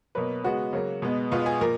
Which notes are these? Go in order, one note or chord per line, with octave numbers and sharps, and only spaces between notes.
B2 F#3 A#3 B4
C#3 G#3 B3 F#4
C#3 F#3 A#3
B2 G#3 B3
B2 G#3 B3 F4
G#4
A#2 F3 A#4